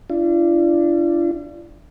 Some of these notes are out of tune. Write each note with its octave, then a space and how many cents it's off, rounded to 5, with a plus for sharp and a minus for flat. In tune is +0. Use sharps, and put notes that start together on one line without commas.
D4 +0 F4 -45